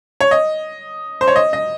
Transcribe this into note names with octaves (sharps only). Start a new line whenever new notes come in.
C#5
D#5
C5
C#5
D#5
D#5